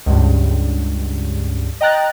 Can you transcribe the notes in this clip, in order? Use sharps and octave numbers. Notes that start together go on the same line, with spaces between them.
C#2 G2
D#5 G5 A#5 F#6 A6